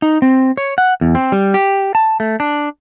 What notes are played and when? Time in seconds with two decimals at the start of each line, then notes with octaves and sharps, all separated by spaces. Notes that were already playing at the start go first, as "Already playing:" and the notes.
0.02 D#4
0.22 C4
0.57 C#5
0.78 F#5
1.01 E2
1.15 C4
1.32 G3
1.54 G4
1.95 A5
2.20 A3
2.40 D4